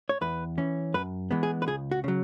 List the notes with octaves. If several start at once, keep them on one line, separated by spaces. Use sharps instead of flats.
C#5
E2 B4
E3 C#4
F#2 B4
E3 G#3 B3
G#4
B4
C#2 G#4
F#4
C#3 F#3